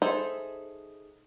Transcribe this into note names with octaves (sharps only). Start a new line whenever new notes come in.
D#4 G#4 A4 C5 E5